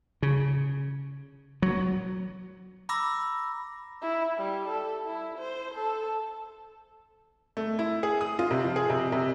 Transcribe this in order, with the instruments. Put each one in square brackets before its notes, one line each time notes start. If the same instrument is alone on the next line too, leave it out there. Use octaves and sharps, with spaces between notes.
[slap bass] C#3
F#3
[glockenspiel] A#5 B5 D6 E6 A#6
[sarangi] E4
G3
A4
E4
C5
A4
[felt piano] A3
E4
G#4
D#6
F4
C3
F3
G#4
C3
C3